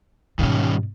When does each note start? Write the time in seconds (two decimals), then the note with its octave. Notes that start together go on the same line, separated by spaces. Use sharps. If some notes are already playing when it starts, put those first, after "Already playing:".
0.39 G#2 B2 D#3 G3 C#4